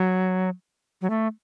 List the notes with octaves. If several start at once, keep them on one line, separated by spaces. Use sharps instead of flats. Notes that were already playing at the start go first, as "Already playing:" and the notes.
Already playing: F#3
F#3
A3